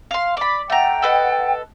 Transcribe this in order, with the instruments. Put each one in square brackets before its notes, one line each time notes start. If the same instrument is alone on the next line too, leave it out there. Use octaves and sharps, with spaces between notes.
[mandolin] F5 C6
D5 B5
[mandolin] A3 A#5 [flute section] F#5 G5
[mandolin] A4 B4 D#5